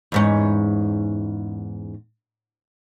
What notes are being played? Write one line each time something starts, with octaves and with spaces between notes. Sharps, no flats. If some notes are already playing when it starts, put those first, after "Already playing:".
E2 G#2 C#4